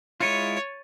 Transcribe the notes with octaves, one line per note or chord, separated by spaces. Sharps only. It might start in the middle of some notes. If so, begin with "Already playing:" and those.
G#3 E4 F4 C#5 A6 C#7 D#7